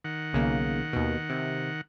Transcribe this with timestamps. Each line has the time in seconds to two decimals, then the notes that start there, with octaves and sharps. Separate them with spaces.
0.04 D#3 F#5
0.33 B1 C#3 A#3
0.93 D#2 B2
1.29 C3